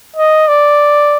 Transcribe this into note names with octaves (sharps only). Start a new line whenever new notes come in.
D#5
D5